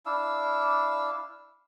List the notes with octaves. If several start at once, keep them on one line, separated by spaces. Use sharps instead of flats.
D4 E4 F5 E6